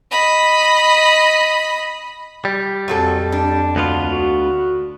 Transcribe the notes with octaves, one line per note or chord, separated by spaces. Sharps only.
D#5 B5
G3
F2 A#2 F#3 A4
D4
D2 B3 F4
F#4